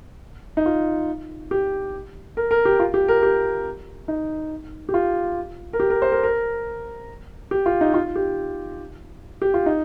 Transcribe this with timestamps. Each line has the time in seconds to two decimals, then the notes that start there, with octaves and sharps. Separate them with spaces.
0.57 D#4
0.66 F4
1.51 G4
2.37 A#4
2.51 A#4
2.65 G4
2.79 F4
2.94 G4
3.08 A#4
3.23 G4
4.08 D#4
4.89 G4
4.94 F4
5.73 A#4
5.80 G4
5.90 A#4
6.02 C5
6.12 A#4
6.23 A#4
7.51 G4
7.66 F4
7.81 D#4
7.94 F4
8.16 G4
9.42 G4
9.54 F4
9.66 D#4